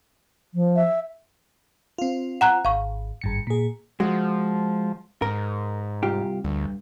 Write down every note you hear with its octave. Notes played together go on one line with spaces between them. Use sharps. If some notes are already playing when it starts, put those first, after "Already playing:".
F3
E5
C4 F4
F#5 A#5 F#6
G#1 F5 C#6
G#1 G2 C#7
A#2 G#4
F3 G#3 F#4
G#2 A#4
C2 F4 G4
D2 G2